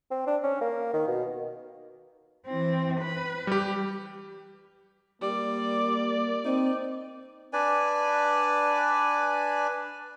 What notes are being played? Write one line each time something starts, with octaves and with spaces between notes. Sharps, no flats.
C4
D4
C#4
A#3
D#3
B2
E3 C4
B4
G3 G4
G3 A#3 D5
C4 D#4
D4 B4 D5 G#5